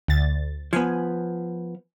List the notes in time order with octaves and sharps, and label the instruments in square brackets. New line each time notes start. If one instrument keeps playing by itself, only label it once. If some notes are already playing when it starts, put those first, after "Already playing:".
[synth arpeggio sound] D2 A6
[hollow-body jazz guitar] F3 B3 [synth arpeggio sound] G#5